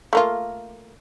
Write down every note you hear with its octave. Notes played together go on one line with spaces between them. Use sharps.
A3 A#3 F4